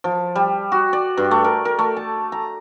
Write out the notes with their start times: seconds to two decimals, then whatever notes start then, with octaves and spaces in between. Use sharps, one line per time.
0.04 F3
0.35 G3
0.72 F#4
0.93 D5
1.17 G2
1.31 A3
1.44 A#4
1.65 A#4
1.79 A3
1.96 A5
2.32 A#5